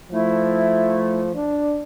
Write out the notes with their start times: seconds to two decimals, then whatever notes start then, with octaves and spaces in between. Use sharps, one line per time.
0.12 F3 A3 E4
1.35 D4